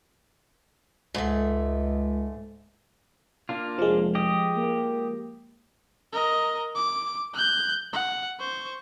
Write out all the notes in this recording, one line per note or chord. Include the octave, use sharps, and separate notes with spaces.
C#2 G#2 A3
A#3 D4 F4
F1 F3 G#3
G4 D#5
A#3
A#4 D#5
D6
F#6 G6
F#5
C5 C#6